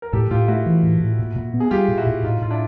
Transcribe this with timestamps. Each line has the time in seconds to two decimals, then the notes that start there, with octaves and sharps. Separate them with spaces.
0.02 A#4
0.13 A2 G4 A4
0.31 A2 F4 G4
0.48 A3 E4 F#4
0.66 E3
0.83 A2
1.01 A2
1.19 A#2
1.36 A#2
1.54 B3
1.60 G#4
1.71 G3 F4 G4
1.88 A#2
1.98 E4 F#4
2.07 A#2
2.23 A2 D#4 F4
2.42 A2 F4
2.50 D4 E4